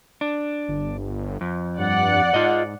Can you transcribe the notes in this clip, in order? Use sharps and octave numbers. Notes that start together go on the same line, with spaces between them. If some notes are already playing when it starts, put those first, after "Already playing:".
D4
G1
F2
G2 D5 F#5
G#2 F4 D#5